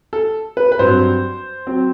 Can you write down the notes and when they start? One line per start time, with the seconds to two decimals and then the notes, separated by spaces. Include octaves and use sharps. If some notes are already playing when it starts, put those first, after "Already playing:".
0.13 A4
0.57 B4
0.72 B4
0.79 G2 F#3 C4 C5
1.67 F#3 C4